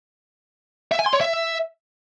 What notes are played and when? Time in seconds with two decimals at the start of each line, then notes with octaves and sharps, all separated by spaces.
0.91 E5
0.99 G#5
1.06 C6
1.13 C#5
1.21 E5